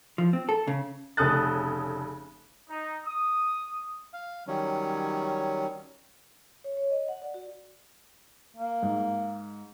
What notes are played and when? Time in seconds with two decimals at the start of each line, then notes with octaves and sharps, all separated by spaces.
0.18 F3
0.33 C4
0.49 A4
0.67 C#3
1.17 F1 C#3 A4 D#6 F#6 A6
2.69 D#4
3.05 D#6
4.13 F5
4.47 D#3 F#3 G3 C#4
6.64 C#5
6.77 C#5
6.91 D#5
7.08 F#5
7.22 D5
7.34 F#4
8.56 A#3
8.82 G#2